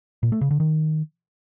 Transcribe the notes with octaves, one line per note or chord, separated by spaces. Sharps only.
A#2
A3
C#3
D3
D#3